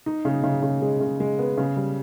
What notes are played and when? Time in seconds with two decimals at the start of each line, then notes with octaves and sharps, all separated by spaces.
0.06 D#4
0.25 C#3
0.44 C#3
0.62 C#3
0.82 G#3
1.00 C#3
1.20 G#3
1.39 B3
1.57 C#3
1.76 G3